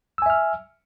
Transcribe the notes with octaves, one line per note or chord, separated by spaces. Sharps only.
E5 G#5 E6 F6